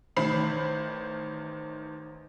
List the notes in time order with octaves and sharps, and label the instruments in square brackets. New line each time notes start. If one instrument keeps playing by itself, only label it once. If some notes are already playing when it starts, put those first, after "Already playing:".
[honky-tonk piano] A1 D#3 C5 B5 C7 F#7